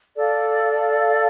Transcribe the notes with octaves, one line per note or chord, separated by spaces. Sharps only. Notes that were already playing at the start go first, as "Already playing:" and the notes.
A4 D5 F5